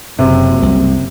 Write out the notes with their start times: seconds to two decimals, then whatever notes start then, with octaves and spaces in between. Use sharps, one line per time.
0.19 F#1 C3
0.63 C2